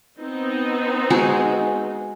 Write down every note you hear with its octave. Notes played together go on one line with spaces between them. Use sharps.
B3 C4 D#4
G#3 F#4 G#4